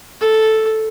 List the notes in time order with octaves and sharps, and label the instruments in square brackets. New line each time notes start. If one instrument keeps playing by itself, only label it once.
[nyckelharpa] A4